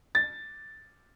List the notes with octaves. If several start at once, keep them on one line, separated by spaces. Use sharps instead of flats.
A6